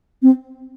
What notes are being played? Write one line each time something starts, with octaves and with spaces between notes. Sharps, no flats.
C4